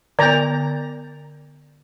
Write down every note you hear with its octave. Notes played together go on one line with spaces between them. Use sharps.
D3 B3 D5 A#5